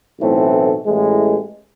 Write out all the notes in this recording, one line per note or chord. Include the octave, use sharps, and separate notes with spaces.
B1 A2 E3 A3 C4
A1 A2 E3 G#3